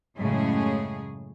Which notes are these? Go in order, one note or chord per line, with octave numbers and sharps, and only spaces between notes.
F#2 A2 C#3 G#3 G#4 C#5